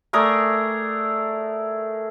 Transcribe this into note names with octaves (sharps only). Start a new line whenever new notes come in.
A3 G#4 A#4 D5